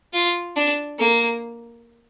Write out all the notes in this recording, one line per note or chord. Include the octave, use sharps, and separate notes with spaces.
F4
D4
A#3